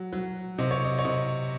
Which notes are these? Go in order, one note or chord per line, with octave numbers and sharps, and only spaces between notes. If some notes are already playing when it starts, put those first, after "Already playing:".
Already playing: F#3
F#3
C3 D#5
C#5
D#5
C#5
C3 D#5